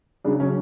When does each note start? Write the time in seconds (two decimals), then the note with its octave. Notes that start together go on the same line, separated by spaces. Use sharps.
0.24 C#3 F#3 D4
0.40 C#4